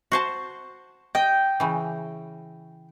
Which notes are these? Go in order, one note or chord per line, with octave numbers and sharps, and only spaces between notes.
F#4 C5 A5
D#5 G5
C#3 E3